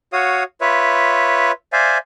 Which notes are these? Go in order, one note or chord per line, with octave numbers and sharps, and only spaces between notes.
F#4 C#5 F5 D#6
F4 B4 C#5 E5
C5 D5 E5 F5 G#5